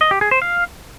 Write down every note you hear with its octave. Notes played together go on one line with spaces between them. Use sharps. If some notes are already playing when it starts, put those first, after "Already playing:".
D#5
G4
G#4
C5
F5